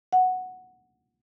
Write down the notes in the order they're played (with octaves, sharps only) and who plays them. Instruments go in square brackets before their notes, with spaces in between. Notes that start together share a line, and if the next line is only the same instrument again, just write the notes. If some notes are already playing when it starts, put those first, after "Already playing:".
[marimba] F#5